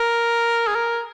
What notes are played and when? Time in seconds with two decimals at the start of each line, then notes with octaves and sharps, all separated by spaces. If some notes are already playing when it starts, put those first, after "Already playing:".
Already playing: A#4
0.67 G#4
0.75 A#4